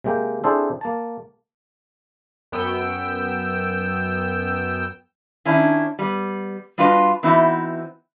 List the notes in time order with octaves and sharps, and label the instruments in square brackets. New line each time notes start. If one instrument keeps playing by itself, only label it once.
[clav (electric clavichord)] C3 G#3 A#3 G5
C4 D4 E4 G#4 A4 C5
A#3 A5
[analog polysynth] F#2 B3 G5 E6
[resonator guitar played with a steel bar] D#3 C#4 D4 E4
G3 B3
G3 D4 F4 F#4 B4 D#5
E3 B3 C4 D#4 E4 F#4